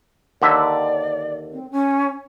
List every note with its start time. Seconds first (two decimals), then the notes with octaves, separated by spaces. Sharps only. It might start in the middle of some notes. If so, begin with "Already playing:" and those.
0.42 D#2 D3 D5 E5
1.52 C4
1.71 C#4